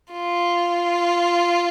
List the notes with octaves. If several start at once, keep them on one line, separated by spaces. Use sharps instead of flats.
F4